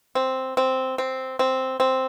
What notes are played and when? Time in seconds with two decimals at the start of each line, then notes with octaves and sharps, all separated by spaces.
0.15 C4
0.57 C4
0.98 C4
1.39 C4
1.80 C4